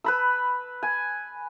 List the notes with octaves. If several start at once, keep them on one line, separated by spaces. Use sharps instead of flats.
B4 B5 E6
G#5